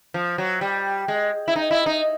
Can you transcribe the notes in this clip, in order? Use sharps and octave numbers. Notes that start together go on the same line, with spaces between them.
F3
F#3
G3
G#3
E4
D#4
E4
D#4